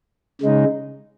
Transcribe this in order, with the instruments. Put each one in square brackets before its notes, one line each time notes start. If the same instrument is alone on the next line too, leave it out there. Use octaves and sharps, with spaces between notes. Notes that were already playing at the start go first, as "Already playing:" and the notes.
[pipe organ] C#3 G#3 D#4